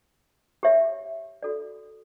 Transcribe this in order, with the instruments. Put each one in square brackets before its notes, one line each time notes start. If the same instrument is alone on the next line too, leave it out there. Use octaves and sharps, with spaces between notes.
[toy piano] G4 C#5 E5
F#4 A4 D5